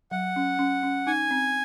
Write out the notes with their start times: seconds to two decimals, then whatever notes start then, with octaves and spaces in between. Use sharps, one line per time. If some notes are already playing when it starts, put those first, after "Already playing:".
0.11 F#3 F#5
0.36 C#4
0.59 C#4
0.83 C#4
1.07 D#4 G#5
1.31 C4